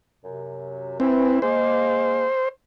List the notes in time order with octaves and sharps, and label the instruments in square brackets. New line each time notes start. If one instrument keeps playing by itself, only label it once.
[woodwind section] F#2 C3
[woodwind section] E3 E4 [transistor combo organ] C4
[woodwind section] G#3 A#3 [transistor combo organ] C5